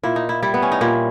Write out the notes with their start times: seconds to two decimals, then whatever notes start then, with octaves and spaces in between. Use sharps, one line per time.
0.03 A#2 E4
0.16 D#4
0.29 E4
0.42 G3 E4
0.54 B3
0.62 C#4
0.72 D#4
0.81 A#2 E4